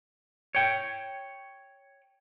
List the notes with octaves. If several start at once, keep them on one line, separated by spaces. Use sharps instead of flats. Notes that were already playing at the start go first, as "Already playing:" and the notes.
C#5 G5